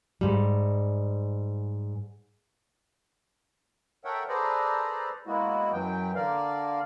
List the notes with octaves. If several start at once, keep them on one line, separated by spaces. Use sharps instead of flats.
G#2 G3
A4 A#4 C#5 E5 F#5 G5
G#4 A4 B4 C5 D5 A#5
G#3 A#3 B3 E4 F#4
F#2 E3 F#3 G5
D3 A#3 A#4 D5 F5